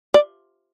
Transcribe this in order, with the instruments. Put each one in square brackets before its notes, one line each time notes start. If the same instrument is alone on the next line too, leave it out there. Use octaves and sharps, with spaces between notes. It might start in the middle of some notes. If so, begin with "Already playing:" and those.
[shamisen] D5